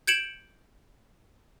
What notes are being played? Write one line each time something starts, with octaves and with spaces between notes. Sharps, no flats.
G6 G#6 C#7 D7 E7 F#7